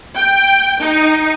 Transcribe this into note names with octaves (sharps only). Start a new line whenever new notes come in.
G5
D#4